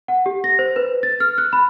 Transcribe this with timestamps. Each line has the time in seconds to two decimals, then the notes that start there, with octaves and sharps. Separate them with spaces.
0.08 F#5
0.26 G4
0.44 A#6
0.59 C5
0.76 B4
1.03 A6
1.20 F6
1.38 F#6
1.53 B5